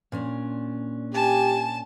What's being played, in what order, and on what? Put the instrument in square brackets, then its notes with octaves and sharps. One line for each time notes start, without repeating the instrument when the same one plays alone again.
[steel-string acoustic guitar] A#2 C#4 D4
[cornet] G4 [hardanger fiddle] G#5 [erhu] A5